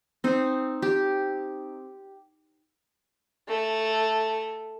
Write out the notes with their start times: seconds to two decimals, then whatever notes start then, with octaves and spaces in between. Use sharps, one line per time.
0.24 C4 D#4
0.82 G4
3.48 A3